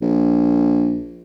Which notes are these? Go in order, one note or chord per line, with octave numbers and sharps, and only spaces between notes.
A#1